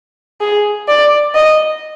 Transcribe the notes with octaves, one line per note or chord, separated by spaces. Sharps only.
G#4
D5
D#5